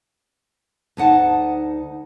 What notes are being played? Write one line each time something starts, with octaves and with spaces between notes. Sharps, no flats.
D2 D#4 F#5 A5